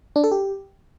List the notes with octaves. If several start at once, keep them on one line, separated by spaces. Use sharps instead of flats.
D4
A4
G4